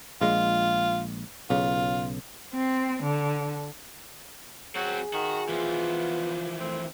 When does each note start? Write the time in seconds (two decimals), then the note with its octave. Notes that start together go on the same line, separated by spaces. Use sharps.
0.21 A#1 G#3 F4
1.50 B1 C#3 F4
2.55 C4
3.03 D3
4.76 F#3 C4 F#4 G#4
5.13 D#3 F#4
5.49 E3 F3 B3 F4
6.60 A3 C4